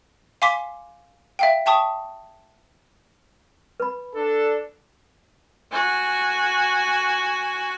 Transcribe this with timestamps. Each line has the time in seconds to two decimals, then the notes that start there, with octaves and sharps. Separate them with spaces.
0.42 F5 G#5 C6 D6 B6
1.39 E5 F5 G5
1.66 E5 G5 A5 C#6 D#6
3.80 B4 B5
4.15 D4 A4
5.72 F#4 G#5